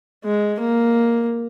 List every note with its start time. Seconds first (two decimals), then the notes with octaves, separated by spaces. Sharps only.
0.24 G#3
0.60 A#3